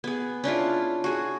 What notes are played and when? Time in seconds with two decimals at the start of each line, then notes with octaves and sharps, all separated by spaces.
0.04 B3 G#4
0.44 C#4 D4 E4 F4
1.04 F#4 G#4